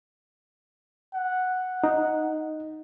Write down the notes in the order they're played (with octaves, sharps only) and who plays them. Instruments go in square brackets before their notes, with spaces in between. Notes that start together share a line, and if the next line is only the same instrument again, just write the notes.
[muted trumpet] F#5
[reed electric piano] D#4